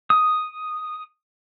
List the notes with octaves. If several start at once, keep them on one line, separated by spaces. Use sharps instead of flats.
D#6